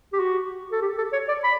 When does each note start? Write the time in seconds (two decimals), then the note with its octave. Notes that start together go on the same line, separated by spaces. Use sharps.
0.13 G4
0.20 F#4
0.72 A4
0.82 G4
0.98 A4
1.13 C#5
1.28 D5
1.44 B5